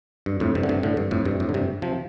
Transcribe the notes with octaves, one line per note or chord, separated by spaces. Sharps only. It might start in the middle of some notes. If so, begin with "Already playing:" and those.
G2
F2 A2
G2 C3
D3
G2 C3
A2 D3
G2
F2 A2
G2 C3
F2 A2
D3
G2 C3
C3 F3